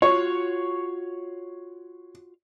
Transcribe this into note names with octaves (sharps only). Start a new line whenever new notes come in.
F4 F#4 C#5